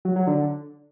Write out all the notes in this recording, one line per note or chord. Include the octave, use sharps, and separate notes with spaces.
F#3
F#3
D3